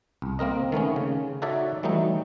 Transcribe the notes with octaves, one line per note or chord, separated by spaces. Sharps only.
C2
A#3 C4 A#4 D#5
D#3 A3 B3 C#4
C#3
D#4 F#4 A4 C#5 D5 E5
E3 F#3 G3 A3 D#4